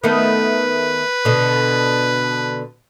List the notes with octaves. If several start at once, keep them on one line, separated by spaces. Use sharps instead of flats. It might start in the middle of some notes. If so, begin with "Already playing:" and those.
D#3 A3 B3 B4
B2 D3